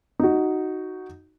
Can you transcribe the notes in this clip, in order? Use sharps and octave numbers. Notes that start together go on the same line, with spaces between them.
D#4 F#4